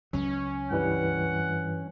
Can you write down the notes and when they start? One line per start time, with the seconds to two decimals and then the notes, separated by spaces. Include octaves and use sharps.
0.13 C#2 F#3 C#4
0.71 G2 E3 G3 F#5